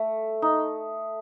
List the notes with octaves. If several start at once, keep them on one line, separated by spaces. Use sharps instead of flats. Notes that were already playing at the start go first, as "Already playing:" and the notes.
Already playing: A3
D#4